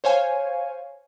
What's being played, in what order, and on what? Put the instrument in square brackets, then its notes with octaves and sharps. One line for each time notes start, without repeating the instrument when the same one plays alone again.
[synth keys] C5 C#5 F5 G#5